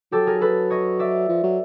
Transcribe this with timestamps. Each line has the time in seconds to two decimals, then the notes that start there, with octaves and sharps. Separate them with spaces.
0.12 F#3 G4 A4
0.27 G#4 A#4
0.41 A4 B4
0.70 C#5 D#5
0.99 D5 E5
1.29 F3
1.44 F#3